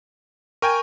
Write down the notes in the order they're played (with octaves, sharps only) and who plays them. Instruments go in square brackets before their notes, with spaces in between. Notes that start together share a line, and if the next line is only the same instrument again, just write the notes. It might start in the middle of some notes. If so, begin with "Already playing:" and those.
[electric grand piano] A#4 G5 G#5 [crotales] C#6